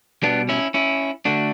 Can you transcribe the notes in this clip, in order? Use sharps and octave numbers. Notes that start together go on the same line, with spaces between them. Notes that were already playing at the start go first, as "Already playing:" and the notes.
B2 G3 B3 D4
C#4 E4
C#4 E4
D3 A3 D4 F#4